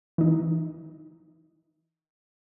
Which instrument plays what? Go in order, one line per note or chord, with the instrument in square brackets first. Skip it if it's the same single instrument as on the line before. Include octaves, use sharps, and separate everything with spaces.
[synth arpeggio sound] E3 D#4